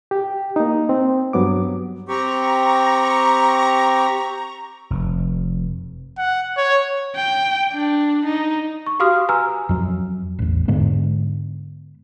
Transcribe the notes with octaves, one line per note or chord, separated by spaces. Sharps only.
G4
A#3 D#4
C4
G2 F#3 B3 D6
C4 G4 A#5 C#6
F1
F#5
C#5
G5
D4
D#4
C#6
F#4 G4 F5 C6 D#6 F6
B4 G#5 A#5 E6 F6
F2 F#3
A1 E2
G#2 D3 G#3 B3